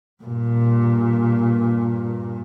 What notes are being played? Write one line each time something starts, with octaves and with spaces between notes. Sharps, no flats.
G2 A#2